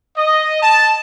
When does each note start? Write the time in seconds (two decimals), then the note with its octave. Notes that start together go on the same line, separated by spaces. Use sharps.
0.16 D#5
0.61 A5